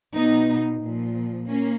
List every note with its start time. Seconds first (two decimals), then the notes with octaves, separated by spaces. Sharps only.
0.15 B2 B3 D#4
0.81 A#2 F3
1.48 A#3 C#4